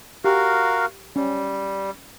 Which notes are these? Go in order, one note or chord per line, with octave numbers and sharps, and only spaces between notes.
F#4 G4 A#4 F5
G3 C#4